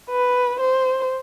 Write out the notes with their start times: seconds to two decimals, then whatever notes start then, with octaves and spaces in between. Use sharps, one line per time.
0.10 B4
0.60 C5